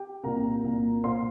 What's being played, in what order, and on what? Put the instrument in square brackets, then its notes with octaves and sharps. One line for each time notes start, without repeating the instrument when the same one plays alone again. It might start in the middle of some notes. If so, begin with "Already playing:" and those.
Already playing: [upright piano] G4 G5
C2 A#2 A#3 A#4 A#5
C2 A#2 A#3
A#2 A#3 C5 C6